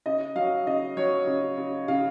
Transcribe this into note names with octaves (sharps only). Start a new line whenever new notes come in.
C#3 D#5
F#3 F5
C#3 D#5
F#3 C#5
C#3
C#3
C#3 F5